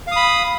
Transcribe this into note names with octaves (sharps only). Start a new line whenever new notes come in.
F5 B5 D#6